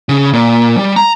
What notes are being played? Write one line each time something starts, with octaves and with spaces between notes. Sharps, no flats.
C#3
A#2
G3
A#5